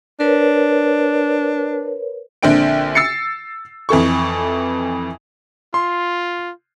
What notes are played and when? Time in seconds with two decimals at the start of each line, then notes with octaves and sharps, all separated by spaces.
0.20 D4 A#4 B4 C#5
2.43 A#1 D3 C4 D4 G5 D7
2.95 E6 A6 C7 C#7
3.89 F2 E3 A4 C#6
5.74 F4 C6